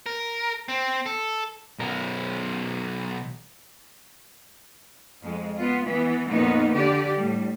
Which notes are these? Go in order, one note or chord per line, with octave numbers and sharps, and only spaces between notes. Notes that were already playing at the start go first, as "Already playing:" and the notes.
A#4
C4
A4
B1 A#4
F2 G#3
B3 F4
E3 B3
F2 A#2 A#3 B3 D#4
D3 G4 D5
A2 G3